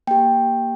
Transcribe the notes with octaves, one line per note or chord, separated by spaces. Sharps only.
A#3 G4 G5